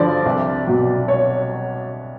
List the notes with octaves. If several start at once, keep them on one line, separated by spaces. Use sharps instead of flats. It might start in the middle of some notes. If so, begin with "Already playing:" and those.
Already playing: G2 D3 F3 D5
C2
B2 F#3
C#5